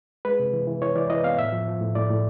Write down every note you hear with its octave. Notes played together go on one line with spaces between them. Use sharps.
G#3 B4
C3
E3
E3
E3 C#5
E3 D5
E3 D#5
B3 F5
A2 E5
F3
F3
A2
A2 D5
A2